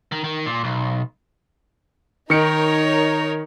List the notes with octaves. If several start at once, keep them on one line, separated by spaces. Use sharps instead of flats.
D#3
D#3
A#2
B1
D#3 D#4 A#4 C#5 C#7 D7